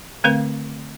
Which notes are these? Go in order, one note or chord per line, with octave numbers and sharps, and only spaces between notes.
D3 A3 C4 A#4 B4 F5